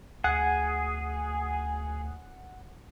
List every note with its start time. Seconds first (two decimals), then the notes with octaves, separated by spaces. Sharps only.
0.24 D2 G#4 F#5